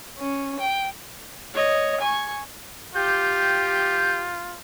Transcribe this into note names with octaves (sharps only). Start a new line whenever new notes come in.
C#4
G5
C#5 D#5
G#5 C#6
F4 G4 G6